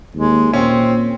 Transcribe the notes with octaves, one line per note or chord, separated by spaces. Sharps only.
D#2 G#3
A#2 C4 C#4